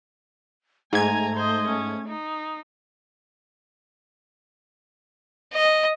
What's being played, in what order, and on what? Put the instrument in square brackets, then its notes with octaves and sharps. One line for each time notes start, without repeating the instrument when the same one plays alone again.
[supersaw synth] G#2 G#6 [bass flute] A3 [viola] G#5 A#5
[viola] C5 D#5
C#4
D#4
[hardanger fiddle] D#5